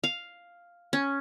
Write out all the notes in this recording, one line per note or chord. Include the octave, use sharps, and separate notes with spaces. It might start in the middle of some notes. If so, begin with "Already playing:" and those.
F5
C#4